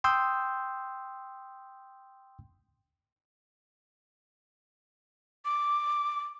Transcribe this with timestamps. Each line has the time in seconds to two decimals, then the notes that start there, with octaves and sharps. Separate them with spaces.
0.04 G5 C6 D#6 E6 G6
5.45 D6